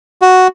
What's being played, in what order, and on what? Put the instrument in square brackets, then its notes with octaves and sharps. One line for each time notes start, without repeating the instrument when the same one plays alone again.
[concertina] F#4